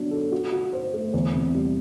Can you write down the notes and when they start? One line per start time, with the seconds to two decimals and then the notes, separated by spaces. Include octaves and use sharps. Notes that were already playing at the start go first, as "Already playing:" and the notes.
Already playing: F#3 B3 D4
0.11 A4
0.32 F#4
0.52 F#4
0.73 C5
0.93 A3
1.14 E2
1.33 C3
1.55 G3